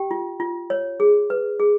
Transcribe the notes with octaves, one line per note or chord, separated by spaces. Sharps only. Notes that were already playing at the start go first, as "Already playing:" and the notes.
Already playing: G4 G5
F4
F4
C#5
G#4
B4
G#4